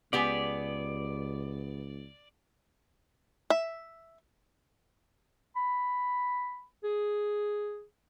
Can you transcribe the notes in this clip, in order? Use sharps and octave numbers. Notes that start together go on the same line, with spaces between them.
C#2 B3 G4 G#4 D5
E5
B5
G#4